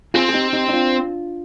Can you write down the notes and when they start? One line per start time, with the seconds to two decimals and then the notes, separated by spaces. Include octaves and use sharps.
0.14 C4 F4 G#4
0.29 G#4
0.34 D#4 G4
0.53 D#4 G4
0.68 D#4
0.73 D4 F4